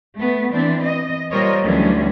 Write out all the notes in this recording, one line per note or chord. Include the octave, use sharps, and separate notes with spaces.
A3 B3
E3 C4 D4
D#5
A#2 G3 A#4 C5 C#5 D#5
D2 E3 F#3 G3 C#4 D4